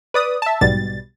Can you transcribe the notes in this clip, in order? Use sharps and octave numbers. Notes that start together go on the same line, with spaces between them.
B4 D5 D#6
E5 A5
B1 G#2 B2 G3 A6